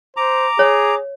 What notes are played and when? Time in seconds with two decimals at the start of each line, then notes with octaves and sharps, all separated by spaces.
0.17 C5 A#5 D6
0.59 G#4 C#5